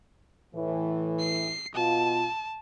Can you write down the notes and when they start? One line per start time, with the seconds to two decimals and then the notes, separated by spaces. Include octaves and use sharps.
0.54 A2 E3
1.20 C7
1.75 B2 F4 A5